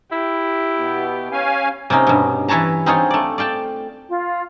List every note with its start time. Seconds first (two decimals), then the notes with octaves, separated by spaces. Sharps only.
0.12 E4 G4
0.78 B2 B3
1.32 C#4 F5 G#5
1.90 C3 A#3 C#4 D#4
2.07 G2 B2
2.48 E3 E4 B4 C#5 A5 A#5
2.86 C4 D#4 F4 G#4 C#5
3.11 A3 D5
3.38 D5 F5 G5 A5
4.09 F4